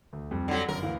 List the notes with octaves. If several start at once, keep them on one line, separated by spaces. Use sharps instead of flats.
D2
F2 G3
D3 F#3
G1 F#2 A#4
D2 E3 F5